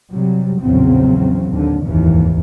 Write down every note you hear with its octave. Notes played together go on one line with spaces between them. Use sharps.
C3 F#3 G3
A#1 E2 A2 C#3 F#3 C4
D#2 D3
F1 D#2 G#2 E3